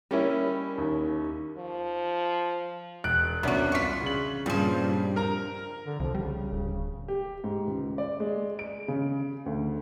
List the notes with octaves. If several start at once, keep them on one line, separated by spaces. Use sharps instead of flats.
G3 C#4 E4 G4 A#4 D#5
D#2
F3
E1 F#6 D7
C2 B3 C#4 D4 F#4
E2 F4 C#6 B6
C#3 F#7
G2 A#2 C#3 F3 C4
A#4 A#5
D3
C2 F3
C#3 G3
D1
G4
G#2
C#2
D5
G#3
D7
C#3
D2